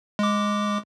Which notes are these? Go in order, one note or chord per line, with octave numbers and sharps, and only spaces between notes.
G#3 D6